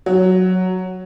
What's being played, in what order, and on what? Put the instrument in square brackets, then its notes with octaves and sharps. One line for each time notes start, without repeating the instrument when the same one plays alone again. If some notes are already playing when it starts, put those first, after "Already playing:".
[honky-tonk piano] F#3